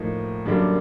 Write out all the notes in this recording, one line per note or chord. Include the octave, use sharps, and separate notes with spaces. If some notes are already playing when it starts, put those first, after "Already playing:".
Already playing: A2 F3 A#3 D#4
F#2 D3 G3 A#3 D4